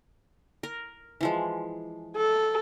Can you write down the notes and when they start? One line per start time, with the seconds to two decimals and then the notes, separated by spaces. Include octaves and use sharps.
0.63 A#4
1.21 E3 F3 G#3
2.17 A4